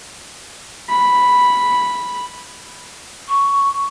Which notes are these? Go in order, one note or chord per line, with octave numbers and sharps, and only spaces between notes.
B5
C#6